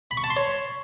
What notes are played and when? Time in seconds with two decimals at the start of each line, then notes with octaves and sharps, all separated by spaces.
0.11 B5
0.17 C#6
0.24 A5
0.30 C6
0.37 C#5